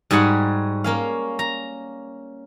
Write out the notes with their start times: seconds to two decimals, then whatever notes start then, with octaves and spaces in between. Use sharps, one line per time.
0.11 G#2 G3 F#4 G#4 F#5 B5
0.84 A#3 C#4 F5
1.39 A#5